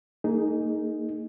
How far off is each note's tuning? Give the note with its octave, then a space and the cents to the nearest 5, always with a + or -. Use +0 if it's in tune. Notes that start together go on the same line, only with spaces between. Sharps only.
A#3 -30 D#4 +0 G#4 +5